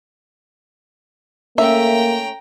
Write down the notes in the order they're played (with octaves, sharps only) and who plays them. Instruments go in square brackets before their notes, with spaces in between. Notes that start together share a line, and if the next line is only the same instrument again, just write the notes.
[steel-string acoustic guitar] A3 C#4 [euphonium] A#3 [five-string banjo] E5 [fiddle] G5 A#5